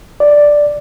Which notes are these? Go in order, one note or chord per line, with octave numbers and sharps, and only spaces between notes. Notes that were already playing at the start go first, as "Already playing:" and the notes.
D5